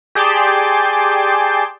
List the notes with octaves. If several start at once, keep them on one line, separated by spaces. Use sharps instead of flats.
G4 G#4 D5 G5 A5 C6